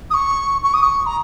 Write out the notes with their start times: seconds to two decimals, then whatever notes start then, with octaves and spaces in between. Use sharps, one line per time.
0.11 D#6
0.14 C#6
0.64 C#6
0.74 D#6
0.83 C#6
1.06 A#5